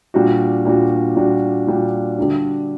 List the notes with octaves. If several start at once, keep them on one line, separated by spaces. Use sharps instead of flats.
A#2 G3 D4 F#4
A#2 G3 D4 F#4
A#2 G3 D4 F#4
A#2 G3 D4 F#4
D3 G3 D4 F#4